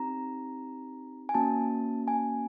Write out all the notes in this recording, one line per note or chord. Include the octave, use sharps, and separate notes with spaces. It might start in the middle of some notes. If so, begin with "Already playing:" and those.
Already playing: C4 D#4 G4 A#5
G#5
A#3 C#4 F#4 A5
G#5